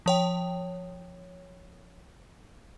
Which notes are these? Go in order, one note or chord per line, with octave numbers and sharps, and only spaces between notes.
F3 C#5 G5